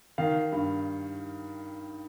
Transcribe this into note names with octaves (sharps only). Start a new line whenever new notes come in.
D#3 F5
G2